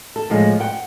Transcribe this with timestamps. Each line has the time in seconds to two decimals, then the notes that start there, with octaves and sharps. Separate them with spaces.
0.16 A4
0.30 A2 F3 G#3
0.60 F#5 G5